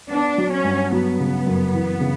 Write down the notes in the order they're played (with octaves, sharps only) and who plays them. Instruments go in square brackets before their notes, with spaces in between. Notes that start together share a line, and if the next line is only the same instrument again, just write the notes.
[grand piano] B3 [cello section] D4
[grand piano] F#3
[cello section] C#4
[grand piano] G2
[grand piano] F#3 [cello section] B3
[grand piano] C#3
F#2
E3
C#3